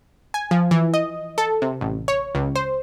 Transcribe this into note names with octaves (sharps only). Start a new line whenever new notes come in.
G#5
F3
E3
D#5
A4
C3
A1
C#5
C#2
C5